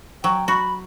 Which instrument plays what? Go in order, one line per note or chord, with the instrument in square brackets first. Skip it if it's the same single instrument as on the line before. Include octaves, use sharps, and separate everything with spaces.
[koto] F#3 [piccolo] G5
[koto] F#4 [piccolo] B5